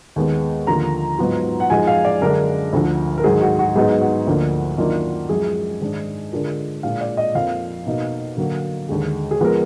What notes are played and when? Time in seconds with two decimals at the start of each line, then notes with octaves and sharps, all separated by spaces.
0.16 D#2 D#3 G#3 B3
0.67 D#2 D3 F3 A#3 F4 A#5
1.19 G#2 F#3 B3 F4
1.60 F#5
1.70 F#2 F3 G#3 D#4 G#5
1.87 F5
2.05 D5
2.21 F#2 D3 G#3 D4 A#4
2.73 D2 D3 F3
3.18 A#4
3.24 G#2 D#3 F#3 G#4
3.41 F#4
3.59 F#4
3.76 G#2 F#3 B3 D#4 G#4
4.01 F#4
4.27 D2 D3 F3 A#3 D4
4.78 F#2 D#3 A#3 D4 F4
5.29 F#2 F3 G#3 G#4
5.81 G#2 D#3 G#3 D4
6.33 D3 G#3 D4 F4 A#4
6.83 A#2 G#3 D4 F5
7.01 D5
7.17 D#5
7.35 F2 F3 A#3 F5
7.86 B2 A#3 D#4
8.37 D3 F#3 A#3
8.89 D#2 D3 G#3
9.31 G#4
9.41 F3 G#3 B3 A#4